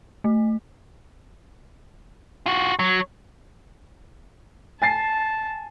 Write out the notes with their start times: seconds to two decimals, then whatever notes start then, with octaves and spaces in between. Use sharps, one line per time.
0.24 A3
2.46 F4 F#4
2.79 F#3
4.82 G#5 A5 A6 C7